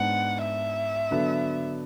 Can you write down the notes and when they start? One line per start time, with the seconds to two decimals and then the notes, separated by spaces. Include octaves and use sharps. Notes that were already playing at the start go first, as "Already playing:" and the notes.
Already playing: G#2 G#3 B3 D4 F#5
0.44 E5
1.11 D3 F#3 B3 D4